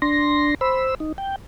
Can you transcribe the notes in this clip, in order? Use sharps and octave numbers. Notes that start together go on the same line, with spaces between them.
D4 C6 A#6
C5 B5 E6
D#4
G5